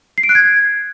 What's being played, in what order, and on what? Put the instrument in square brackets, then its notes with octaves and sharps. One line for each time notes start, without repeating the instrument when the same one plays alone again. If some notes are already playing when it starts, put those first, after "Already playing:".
[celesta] C7
D7
F#6
G#6